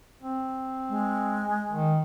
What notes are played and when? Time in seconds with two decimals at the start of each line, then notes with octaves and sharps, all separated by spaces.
0.21 C4
0.89 G#3
1.72 D#3